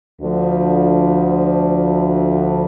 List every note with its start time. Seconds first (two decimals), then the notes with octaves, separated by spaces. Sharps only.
0.21 D2 D3 F3